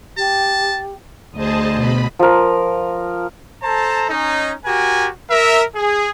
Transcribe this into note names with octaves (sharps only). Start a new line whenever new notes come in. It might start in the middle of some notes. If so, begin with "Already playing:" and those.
G4 A5
D2 G#4 C5 D#5 A5
B2 B5
F3 A#4
A4 C5 A5 A#5
C#4 D#4
F#4 G4 A#4 G#5
A#4 E5
G#4